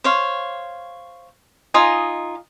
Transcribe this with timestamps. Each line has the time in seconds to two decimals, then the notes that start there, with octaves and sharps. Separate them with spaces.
0.04 C5 C#5 F5
1.74 D#4 F4 D#5 G#5